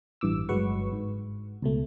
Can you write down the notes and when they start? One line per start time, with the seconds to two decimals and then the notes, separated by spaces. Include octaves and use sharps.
0.21 A1 G2 E3 D6 E6
0.49 G1 F#3 G#3 B4 F#5 C#6
0.93 G#2
1.62 C#2 B2 A3